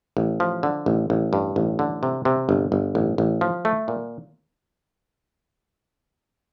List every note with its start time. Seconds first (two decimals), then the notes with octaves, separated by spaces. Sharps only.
0.17 A1
0.40 F3
0.63 D3
0.86 A1
1.10 A1
1.33 G2
1.56 A1
1.79 D3
2.03 C3
2.25 C3
2.49 G1
2.72 G1
2.95 A1
3.18 A1
3.41 F3
3.65 A3
3.88 A#2